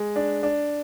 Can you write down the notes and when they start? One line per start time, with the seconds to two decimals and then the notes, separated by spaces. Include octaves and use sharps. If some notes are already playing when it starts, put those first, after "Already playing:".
Already playing: G#3
0.16 D4
0.43 D4